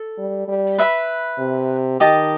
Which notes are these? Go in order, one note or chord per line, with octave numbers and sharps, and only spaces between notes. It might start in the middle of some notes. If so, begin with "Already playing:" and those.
Already playing: A4
G3
G3
B4 E5 B5
C3
D#3 G4 D#5 A5 D#6